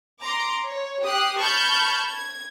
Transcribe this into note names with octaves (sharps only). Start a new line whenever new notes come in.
A#5 C6 D6
C#5
G4 D#6 F#6 C7
A5 B5 C#6 F6 G6 G#6
G#6